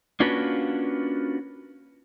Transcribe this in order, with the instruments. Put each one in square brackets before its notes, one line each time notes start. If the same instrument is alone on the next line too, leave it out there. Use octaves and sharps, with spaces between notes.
[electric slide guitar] A#3 C#4 D4 F4 F#4 B4